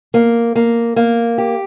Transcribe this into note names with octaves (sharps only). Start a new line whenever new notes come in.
A#3
A#3
A#3
G4